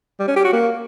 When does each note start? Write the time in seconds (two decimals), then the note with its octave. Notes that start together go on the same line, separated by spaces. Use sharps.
0.19 G3
0.28 C#4
0.36 G4
0.44 F#4
0.52 A#3